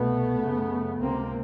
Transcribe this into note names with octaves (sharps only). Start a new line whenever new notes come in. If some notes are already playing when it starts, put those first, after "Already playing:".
Already playing: C2 B2 A3 B3
F#2 C#3
C#2 C3 A#3 C4